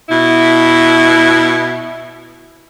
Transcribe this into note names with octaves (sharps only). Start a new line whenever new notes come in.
B2 E4